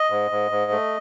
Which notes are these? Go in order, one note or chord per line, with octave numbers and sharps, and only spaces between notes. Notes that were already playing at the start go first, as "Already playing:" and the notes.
Already playing: D#5
G#2
G#2
G#2
A3